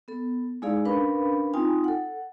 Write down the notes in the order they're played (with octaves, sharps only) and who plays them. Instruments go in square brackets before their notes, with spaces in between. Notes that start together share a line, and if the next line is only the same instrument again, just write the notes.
[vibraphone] B3 A4
G#3 D#4 E4 G#4 D5 F5
C#4 D4 A#4 B4 F5 B5
C4 D#4 F4 G5 G#5 D#6
A4 F#5